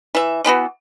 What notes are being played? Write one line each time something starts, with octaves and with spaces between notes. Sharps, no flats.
E3 E5
D3 E3 B3 F#4